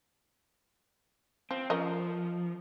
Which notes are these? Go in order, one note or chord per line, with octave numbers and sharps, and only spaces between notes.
F3 C4
F3 C#4 A#4 D#5